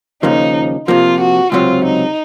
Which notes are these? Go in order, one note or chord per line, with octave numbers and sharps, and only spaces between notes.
D#2 C#3 F3 A#3 D#4
C3 F3 A#3 F4
F#4
C#2 C3 F#3 C4 F4
D#4